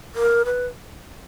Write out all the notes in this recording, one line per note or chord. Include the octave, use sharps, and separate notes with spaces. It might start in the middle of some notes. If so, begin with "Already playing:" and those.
A#4
B4